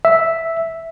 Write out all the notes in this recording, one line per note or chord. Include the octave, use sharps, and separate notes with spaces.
E5